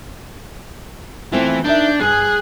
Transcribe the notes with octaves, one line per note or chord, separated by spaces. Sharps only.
E3 A3 C4 F4
A#3 D4 D#4 E5 G6
G2 G#4 G#5 F#6